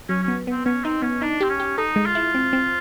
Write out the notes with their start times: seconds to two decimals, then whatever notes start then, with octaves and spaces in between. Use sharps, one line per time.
0.09 F#3 C#4
0.23 B3 C#4
0.47 B3 C4
0.65 B3 C#4
0.84 C4 D#4
1.02 B3 C#4
1.22 D4 D#4
1.41 C4 G4
1.50 C#4
1.60 G4
1.78 D#4 A4
1.96 G#3
2.06 F4
2.15 E4
2.35 C4
2.53 C4